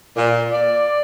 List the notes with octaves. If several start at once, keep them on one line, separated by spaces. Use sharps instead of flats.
A#2
D5